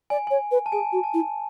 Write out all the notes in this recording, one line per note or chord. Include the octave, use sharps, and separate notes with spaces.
D5 G#5
C#5 G#5
B4
A5
G#4 G#5
F#4
A5
E4